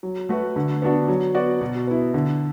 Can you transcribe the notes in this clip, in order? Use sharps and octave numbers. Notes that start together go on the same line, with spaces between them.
F#3
A3 F#4 B4
D3
B3 D4 F#4
F#3
B3 F#4 D5
B2
B3 E4
D3